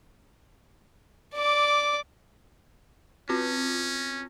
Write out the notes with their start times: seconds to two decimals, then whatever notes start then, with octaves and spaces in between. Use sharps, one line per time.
1.35 D5 D6
3.29 C4 C#4 F4 A#6